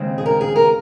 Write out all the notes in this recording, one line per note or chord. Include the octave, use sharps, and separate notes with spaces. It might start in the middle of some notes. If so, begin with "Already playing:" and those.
Already playing: D#2 C#3 G#3 C4
G#4
A#4
G#4
A#4